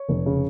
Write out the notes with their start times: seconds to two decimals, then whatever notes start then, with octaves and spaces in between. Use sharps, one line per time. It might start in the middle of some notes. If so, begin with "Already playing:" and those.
Already playing: C#5
0.09 F1
0.26 C#3